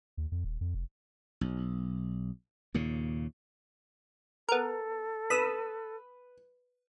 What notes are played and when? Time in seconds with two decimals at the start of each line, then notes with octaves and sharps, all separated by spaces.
0.17 D#2
0.32 F2
0.44 D#1
0.61 F2
0.74 F1
1.41 B1
2.74 D#2 A#2 C#3
4.49 B3 A4 A#4
5.30 B4 B5 D#6 E6